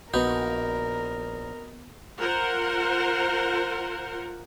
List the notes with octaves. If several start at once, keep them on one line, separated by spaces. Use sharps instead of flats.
A#1 B3 D#4 F#4 A#4 B4 G6
F4 A#4 C5 F#5